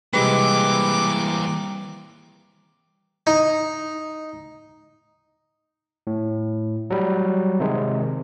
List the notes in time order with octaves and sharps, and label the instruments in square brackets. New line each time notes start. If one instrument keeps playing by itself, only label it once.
[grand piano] C3 G#3 B4 [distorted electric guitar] E3 A#3 [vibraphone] G3 [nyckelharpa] D6
[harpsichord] D#4
[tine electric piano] A2
F#3 G3
C3 D#3 G#3